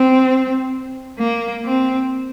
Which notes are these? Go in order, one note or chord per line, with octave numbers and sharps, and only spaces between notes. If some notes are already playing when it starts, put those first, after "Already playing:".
Already playing: C4
A#3
C4